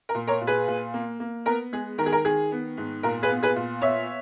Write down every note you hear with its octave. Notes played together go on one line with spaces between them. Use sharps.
A#4
A#2
A#4 C#5
A#2
G#4 B4
A#2
A#3
A#3
B3 A#4
G#3 G#4
D#3 A#4
G#4
A#4
D#3 G#4
B3
G#2
A#2 A#4
G#4 B4
B3
G#4 B4
A#2
B3 C#5 E5